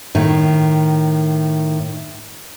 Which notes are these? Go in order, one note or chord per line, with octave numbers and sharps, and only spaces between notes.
A2 D#3